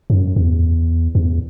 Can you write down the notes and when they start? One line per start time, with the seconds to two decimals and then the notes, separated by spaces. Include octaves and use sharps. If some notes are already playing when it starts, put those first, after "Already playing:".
0.10 F#2
0.36 E2
1.15 E2